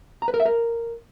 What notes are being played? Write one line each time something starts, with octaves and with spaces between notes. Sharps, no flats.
A#5
B4
A#4
E5
A#4